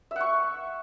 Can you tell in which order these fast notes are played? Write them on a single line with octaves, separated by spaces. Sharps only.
E5 F#5 C#6